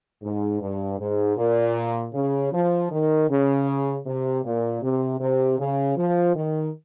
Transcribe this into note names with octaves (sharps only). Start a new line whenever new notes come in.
G#2
G2
G#2
A#2
C#3
F3
D#3
C#3
C3
A#2
C3
C3
C#3
F3
D#3